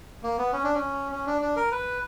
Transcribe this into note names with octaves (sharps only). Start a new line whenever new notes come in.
A#3
B3
C#4
D4
C#4
C#4
D4
D4
A#4
B4